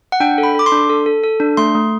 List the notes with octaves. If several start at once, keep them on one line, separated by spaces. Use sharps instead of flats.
F#5
D4 G5
A4
B5
A4 D6
C6
D4
A4
A4
A4
D4
A3 C6
A3